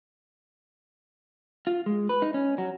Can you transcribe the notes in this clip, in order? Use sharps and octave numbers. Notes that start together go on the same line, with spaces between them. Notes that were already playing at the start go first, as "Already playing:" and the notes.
F4
G#3
B4
D#4
C#4
F#3